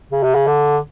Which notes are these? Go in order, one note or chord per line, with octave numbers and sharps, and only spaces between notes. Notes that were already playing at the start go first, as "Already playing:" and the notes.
C#3
C3
C#3
D3